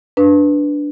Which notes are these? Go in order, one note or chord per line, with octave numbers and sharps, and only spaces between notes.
D4 B4